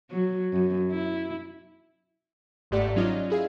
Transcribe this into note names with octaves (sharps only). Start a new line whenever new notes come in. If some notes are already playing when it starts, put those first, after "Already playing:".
F#3
F#2
E4
G1 G#2 A3 G4 D5 F#5
F#3 C#4 D#4 F4 D5 D#5
E4 G#4 F5